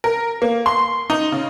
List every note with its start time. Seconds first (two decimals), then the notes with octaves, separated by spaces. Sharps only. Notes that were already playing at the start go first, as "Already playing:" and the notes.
0.04 A#4
0.42 A#3
0.66 C6
1.10 D#4
1.32 C#3